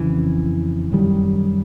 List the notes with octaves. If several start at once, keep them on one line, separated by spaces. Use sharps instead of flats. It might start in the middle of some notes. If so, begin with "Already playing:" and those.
Already playing: F2 C#3 E3
F#2 D#3 G3